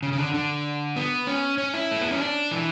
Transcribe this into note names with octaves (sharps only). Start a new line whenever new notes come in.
C#3
C#3
D3
D3
B3
C#4
C#4
E4
A3
B3
C#4
D4
E3